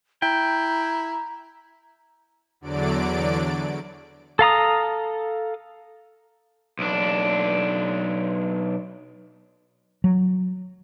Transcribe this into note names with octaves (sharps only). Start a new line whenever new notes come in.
E4 G5 A#5
E2 D3 F#3 D5 D7
A4 F5 A#5 D#6
B1 D4
F#3